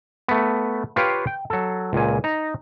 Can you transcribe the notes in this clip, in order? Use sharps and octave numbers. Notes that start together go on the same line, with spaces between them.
A3 B3
F4 G4 B4 C#5 F5 G5
G5
F#3 A4
C#2 A#2 G#5
D#4 A#5